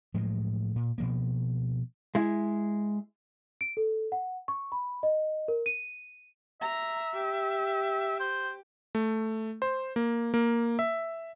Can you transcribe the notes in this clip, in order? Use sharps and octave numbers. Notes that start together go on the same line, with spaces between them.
A2 F3 F#3 G#3
A#2
B2 F3 A#3
G#3 E4
D7
A4
F#5
C#6
B5
D#5
A#4
D#7
E5 A#5
G4
C5
A3
C5
A#3
A#3
E5